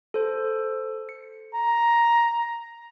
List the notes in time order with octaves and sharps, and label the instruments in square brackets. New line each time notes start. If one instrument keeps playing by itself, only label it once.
[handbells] A4 C5
C#7
[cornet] A#5